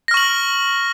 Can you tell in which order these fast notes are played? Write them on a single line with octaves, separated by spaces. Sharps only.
A#6 F6 C#6 F#7